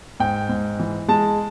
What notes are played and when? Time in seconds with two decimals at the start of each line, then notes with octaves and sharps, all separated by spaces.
0.20 G#2 G5
0.49 G#2
0.79 E3
1.08 G#3 A5